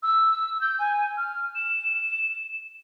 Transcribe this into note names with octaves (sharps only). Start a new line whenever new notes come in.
E6
G6
G#5
F6
E7